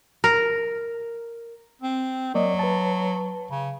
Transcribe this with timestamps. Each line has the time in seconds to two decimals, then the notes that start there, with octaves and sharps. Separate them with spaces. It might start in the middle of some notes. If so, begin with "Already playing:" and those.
0.24 A#4
1.82 C4
2.34 F#3 A#3 D5 D#5
2.59 B4 A5
3.51 C#3